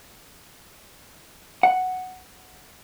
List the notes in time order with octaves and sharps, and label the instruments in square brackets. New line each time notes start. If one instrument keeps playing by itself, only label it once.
[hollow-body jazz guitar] F#5